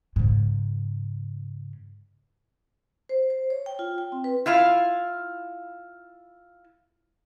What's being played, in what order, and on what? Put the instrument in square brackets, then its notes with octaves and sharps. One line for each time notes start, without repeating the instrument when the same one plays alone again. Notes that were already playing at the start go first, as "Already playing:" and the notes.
[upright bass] G#2 C#3
[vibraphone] C5
C5
C#5
G5
F4
G5
C4
B4
[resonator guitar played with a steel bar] E4 F4 F5